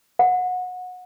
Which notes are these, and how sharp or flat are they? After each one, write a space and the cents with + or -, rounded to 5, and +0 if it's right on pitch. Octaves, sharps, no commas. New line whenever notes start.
F#5 -25